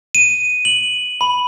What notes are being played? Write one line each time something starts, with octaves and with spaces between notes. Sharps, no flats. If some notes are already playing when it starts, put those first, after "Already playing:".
D#7
F#7
B5